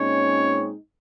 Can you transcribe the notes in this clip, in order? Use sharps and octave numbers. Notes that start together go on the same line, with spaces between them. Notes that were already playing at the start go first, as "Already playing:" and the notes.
Already playing: A#2 G#3 C4 C#4 D#4 C#5